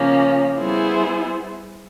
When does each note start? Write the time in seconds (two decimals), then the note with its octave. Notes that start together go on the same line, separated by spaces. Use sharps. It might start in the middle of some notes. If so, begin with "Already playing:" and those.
Already playing: C#3 F3 A#3 C#4
0.57 G3 B3 E4 G#4 C5